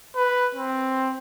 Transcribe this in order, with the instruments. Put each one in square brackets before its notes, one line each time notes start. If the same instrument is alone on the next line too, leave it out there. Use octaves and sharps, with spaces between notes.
[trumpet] B4
C4